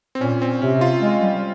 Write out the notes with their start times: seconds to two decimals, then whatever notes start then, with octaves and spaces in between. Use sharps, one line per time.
0.15 C4
0.21 A#2 C#4
0.42 C4
0.62 C3 C#4
0.81 F4
1.02 G#3
1.22 G3